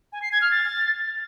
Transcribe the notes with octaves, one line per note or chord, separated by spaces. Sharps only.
G#5
C7
G#6
F6
A6